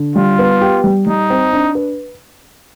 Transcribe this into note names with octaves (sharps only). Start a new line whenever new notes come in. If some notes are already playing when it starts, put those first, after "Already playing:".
Already playing: D3
G3 F4
B3
G4
G3
G3 D#4
C4
D4
B4